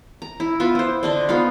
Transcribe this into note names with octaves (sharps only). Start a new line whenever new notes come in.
A#5
E4
B3 F4 B4 E5
E4 C5
D3 D4 D#5
B3 D#4 F4 F5